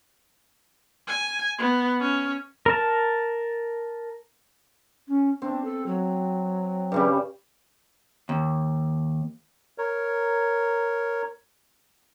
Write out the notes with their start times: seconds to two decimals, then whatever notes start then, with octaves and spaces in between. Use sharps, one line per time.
1.07 G#5
1.59 B3
2.00 C#4
2.66 A#4 A5
5.08 C#4
5.42 C4 D4
5.64 A4
5.86 F#3
6.92 G2 C#3 G3
8.29 D#2
9.78 A#4 C#5